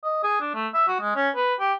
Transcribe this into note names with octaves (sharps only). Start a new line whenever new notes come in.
D#5
G#4
D4
A3
E5
F#4
G#3
C#4
B4
G4